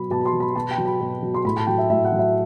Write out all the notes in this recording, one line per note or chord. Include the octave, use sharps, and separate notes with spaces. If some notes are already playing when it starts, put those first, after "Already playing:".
Already playing: B2 F#3 B5
B2 A5
B5
C6
F#3
B5
B2 A5
G5
F#3
B5
B2
F#3
C6
A2 B5
A5
F#3 G5
E5
A2 E5
F#5
F#3
E5